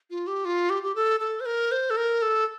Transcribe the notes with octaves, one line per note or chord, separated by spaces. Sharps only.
F4
G4
F4
G4
G4
A4
A4
C5
A#4
C5
A4
A#4
A4